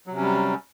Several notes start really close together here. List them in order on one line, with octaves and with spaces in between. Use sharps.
F#3 C3 C#4 G3